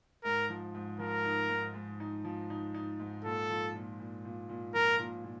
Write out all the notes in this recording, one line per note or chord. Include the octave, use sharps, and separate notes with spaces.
G#2 A#4
F3
G#2
F3 A#4
D#4
G#2
G#2
D#4
F3
D#4
D#4
G#2
A#2 A4
F3
A#2
A#2
A#2
A#2
F3 A#4
A#2
A#2